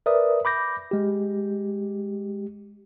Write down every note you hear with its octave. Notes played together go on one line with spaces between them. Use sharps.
A#4 B4 D5 E5 D#6
B5 D6 G6 A#6
G#3 G4